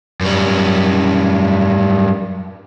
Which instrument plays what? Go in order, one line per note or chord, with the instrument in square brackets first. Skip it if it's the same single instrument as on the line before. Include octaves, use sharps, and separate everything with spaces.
[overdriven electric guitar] F#2 G3